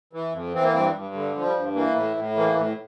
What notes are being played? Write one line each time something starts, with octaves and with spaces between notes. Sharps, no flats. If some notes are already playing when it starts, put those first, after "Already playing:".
E3
F2
E3 C4
A#3
G2 C4
G2
D3
F3
G3
G2
E3 A#3
A2
A2
E3 A#3
A2